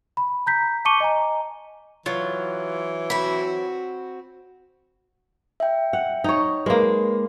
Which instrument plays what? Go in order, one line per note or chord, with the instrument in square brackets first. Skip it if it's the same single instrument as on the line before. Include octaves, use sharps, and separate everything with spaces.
[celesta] B5
A#5 G6 B6
A5 C#6 D6 C#7 D#7 G7
D#5 G#5 A#5
[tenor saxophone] E3 [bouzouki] F#3 [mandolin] F4
[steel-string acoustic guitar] C4 F#4 [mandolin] B5
[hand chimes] E5 G5
[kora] F#5
D#4 C#5
[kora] G#3 A#3 [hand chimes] B4